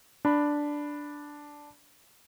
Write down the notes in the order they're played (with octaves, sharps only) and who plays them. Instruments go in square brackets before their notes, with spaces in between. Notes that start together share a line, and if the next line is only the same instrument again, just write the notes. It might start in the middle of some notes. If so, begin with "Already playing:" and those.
[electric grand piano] D4 B5